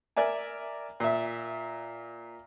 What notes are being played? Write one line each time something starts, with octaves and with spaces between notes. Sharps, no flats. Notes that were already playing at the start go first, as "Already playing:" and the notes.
A#4 D5 E5 G#5
A#2 E5